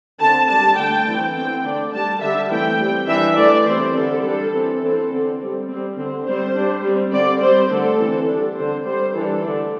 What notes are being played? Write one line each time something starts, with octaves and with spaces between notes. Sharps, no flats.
D3 C4 A5
G3 D4 A5
D3 A3 D4 G5
E3 C4
D3 C4 G5
D3 A3 D4 D5
G3 D4 A5
D3 G3 D4 E5
E3 A3 C4 G5
G3 C4
E3 G3 D4 E5
E3 A3 D4 D5
E3 G3 C4 C5
D3 G3 C4 A4
G3 D4 A4
E3 C4
E3 C4 A4
D3 C4
G3 C4
G3 C4
D3 C4
G3 C4 C5
G3 D4
G3 C4
D3 G3 C4 D5
G3 C4 C5
D3 A3 C4 A4
E3 C4
D3 G3 D4
D3 C4 C5
G3 C4 C5
E3 G3 D4 A4
D3 A3 D4